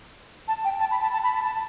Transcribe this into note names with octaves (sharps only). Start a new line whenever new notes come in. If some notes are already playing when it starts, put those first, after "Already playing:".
A5
G5
A5
B5
A5
A5
B5
A5
A5